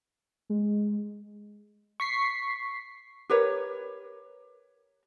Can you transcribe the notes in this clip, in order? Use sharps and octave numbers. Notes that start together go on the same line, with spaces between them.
G#3
C#6 B6 C7
G4 A#4 B4 C#5